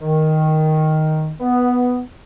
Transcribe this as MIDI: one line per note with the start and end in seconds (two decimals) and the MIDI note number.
0.01 1.33 51
1.40 2.00 59